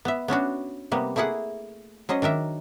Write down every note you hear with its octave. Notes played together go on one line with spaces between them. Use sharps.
B3 E5
B3 C#4 D4 F#4
C3 G3 A#3 B3
A3 A#3 E4 G#4 F#5
F#3 C#4 C5 D#5
D#3 D4 A#4 E5